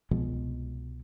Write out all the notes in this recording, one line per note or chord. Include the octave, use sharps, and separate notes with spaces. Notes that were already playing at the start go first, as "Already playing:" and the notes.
C2 B2 F3 G#3